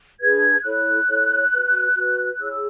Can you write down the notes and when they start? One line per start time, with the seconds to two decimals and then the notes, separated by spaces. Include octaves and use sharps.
0.20 D4 G#4 B4 G#6
0.64 E4 A4 C#5 F#6
1.07 E4 A4 C#5
1.52 F#4 B4
1.95 F#4 B4
2.39 E4 G#4 C#5 E6